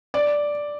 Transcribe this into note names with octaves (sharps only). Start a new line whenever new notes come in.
D5